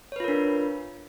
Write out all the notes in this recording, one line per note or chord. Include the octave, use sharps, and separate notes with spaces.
D4 F4 A#4 B4 C#5